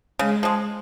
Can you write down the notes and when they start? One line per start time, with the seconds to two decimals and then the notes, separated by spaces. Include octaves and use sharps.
0.19 C#3 G#3
0.43 F3 G#3